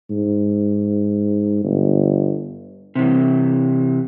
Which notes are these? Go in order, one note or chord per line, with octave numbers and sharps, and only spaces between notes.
G#2
G1
C3 E3